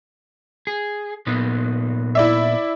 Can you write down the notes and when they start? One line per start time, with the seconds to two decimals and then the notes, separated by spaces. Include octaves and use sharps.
0.67 G#4
1.27 A#2 B3 D#4
2.15 E4 D5 E5